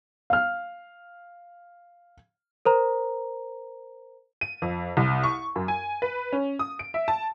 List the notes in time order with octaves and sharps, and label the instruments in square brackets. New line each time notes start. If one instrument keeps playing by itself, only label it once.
[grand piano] F5 F6
[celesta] A#4 C5 A#5
[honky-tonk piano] D#7
F2
C2
C#6
F#2
G#5
B4
C#4
D#6
D7
E5
A5